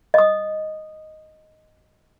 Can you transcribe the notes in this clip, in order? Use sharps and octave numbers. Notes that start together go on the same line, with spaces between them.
D#5 D#6